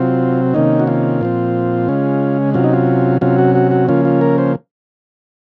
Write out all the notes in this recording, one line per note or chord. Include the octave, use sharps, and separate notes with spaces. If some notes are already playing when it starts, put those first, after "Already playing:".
Already playing: C3 F#3 C4 F4
C3 D#3 A#3 C#4 D#4
F#4
F4
A#2 F3 C4
C#3 G#3 C#4
C3 F#3 C#4 F4
D#4
F4
C3 F#3 C#4 F4
F#4
F#4
F#4
C#3 F3 A#3 C#4 F4
F4
A#4
C5